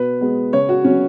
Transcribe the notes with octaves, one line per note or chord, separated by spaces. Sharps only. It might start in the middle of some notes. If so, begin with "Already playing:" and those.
Already playing: B2 B4
G#3 B3
C#3 C#5
F#4
F#3 B3 C#4